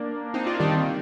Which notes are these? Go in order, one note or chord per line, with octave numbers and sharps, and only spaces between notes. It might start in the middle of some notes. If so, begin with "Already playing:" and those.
Already playing: A#3 D4
C4 D#4
D4 F4
D#3 G3